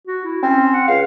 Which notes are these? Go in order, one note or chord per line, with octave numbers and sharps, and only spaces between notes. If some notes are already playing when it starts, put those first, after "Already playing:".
F#4
E4
C4 C#4
F#5
C#2 F5